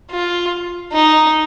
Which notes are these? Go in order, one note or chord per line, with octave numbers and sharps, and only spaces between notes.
F4
D#4